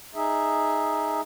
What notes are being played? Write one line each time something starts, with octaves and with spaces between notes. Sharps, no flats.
D#4 G#4 E5